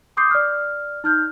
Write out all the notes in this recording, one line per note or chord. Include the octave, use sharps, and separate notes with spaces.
C6 D6 D#6 G6 C7
D5 F6
D#4 F6 G6